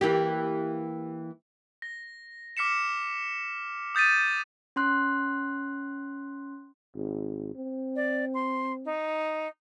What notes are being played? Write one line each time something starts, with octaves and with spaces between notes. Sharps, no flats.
E3 A#3 G4
A#6
D6 F6 B6 C#7 E7
D#6 G6 A6 B6 D#7
C#4 C6 F#6
G#1
C4
D5
C6
D#4